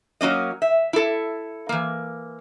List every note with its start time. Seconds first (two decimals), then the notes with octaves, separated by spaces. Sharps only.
0.21 F#3 A#3 C#4 D#5
0.62 E5
0.93 E4 A4
1.69 E3 A#3